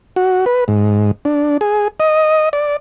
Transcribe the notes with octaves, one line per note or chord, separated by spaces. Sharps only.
F#4
B4
G#2
D4
G#4
D#5
D5